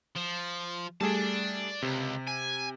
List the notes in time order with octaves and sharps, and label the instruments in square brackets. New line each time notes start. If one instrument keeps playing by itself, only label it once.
[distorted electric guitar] F3
[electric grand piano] G3 A3 G#4 [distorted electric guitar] D5 A5
[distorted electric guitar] C#2 [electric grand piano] C3
[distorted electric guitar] G#5